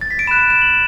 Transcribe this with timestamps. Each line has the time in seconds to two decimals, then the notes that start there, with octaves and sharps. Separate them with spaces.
0.01 A6
0.10 B6
0.19 D7
0.27 B5 F#6 E7
0.38 D7
0.50 E7
0.62 F#7